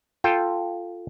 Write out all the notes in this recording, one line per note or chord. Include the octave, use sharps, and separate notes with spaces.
F4 A4 G5